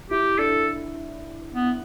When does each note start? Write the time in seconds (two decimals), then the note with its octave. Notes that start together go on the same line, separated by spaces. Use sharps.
0.10 E4 G4
0.39 D4 A4
1.54 B3